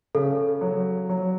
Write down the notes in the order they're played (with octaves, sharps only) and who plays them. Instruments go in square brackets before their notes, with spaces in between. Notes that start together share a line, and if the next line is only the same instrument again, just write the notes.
[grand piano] C#3 [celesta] A4
[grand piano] F#3
F#3